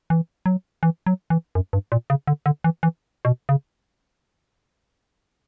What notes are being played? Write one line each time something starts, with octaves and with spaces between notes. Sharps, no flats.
E3
F#3
E3
F#3
E3
F#2
G2
A#2
C#3
D3
D3
E3
E3
B2
C#3